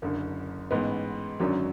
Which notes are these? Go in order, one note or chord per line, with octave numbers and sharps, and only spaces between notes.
F#1 F#2 D3
A1 G#2 G#3 B3
G#1 F#2 D3 F#3 C#4